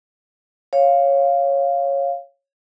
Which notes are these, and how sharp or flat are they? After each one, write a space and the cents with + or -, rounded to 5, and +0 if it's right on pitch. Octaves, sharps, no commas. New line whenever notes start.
C#5 -5 F5 +0